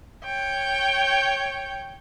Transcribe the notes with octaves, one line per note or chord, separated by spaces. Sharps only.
C#5 G5